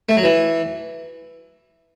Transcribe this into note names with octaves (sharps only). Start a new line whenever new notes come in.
A3
F#3
E3